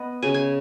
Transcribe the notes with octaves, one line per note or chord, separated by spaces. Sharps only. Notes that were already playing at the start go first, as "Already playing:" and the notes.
Already playing: B3 D#5
C#3 G#5
G#5